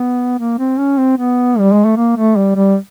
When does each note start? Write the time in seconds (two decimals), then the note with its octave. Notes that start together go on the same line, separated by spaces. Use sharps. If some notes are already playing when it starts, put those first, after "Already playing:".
Already playing: B3
0.39 A#3
0.59 C4
0.78 C#4
0.98 C4
1.18 B3
1.59 G3
1.72 G#3
1.85 A3
1.97 A#3
2.17 A3
2.37 G3
2.56 G3